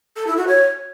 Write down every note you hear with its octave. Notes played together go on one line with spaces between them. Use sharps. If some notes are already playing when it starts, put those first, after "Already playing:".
A4
E4
F#4
C#5